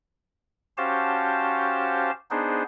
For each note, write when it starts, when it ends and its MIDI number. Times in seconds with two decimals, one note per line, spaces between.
0.78 2.11 61
0.78 2.11 66
0.78 2.11 67
0.78 2.11 72
0.78 2.11 77
0.78 2.11 81
2.31 2.63 59
2.31 2.63 62
2.31 2.63 63
2.31 2.63 68
2.31 2.63 72